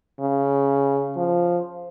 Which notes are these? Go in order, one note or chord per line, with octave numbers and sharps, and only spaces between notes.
C#3
F3